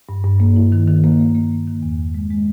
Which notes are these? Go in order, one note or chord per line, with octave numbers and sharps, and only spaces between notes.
G2
G2
A#3
E4
D#3
D#3
A#3
A#3
A#3
A#3
D#3
E2
E2
G#3
G#3